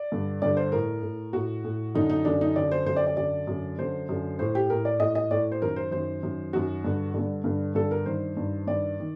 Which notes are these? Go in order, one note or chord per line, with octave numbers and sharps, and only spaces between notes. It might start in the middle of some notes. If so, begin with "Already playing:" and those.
Already playing: D5
G2 D3
G2 D3 D5
C5
A2 A#4
A2
A2 F#4
A2
F#2 D3 D#4
D#4
F#2 D3 D4
D#4
F#2 D3 D5
C5
F#2 D3 C5
D5
D5
F#2 D3 D5
F#2 D3
F#2 D3 C5
F#2 D3
A2 C5
G4
A2 A#4
D5
A2 D#5
D#5
A2 D5
C5
F#2 D#3 A#4
C5
F#2 D#3 C5
F#2 D#3
F#2 D#3 F#4
G2 D3
G2 D3
G2 D3
G2 D3 A4
A#4
G2 D#3 C5
G2 D#3
G2 D#3 D5
D#3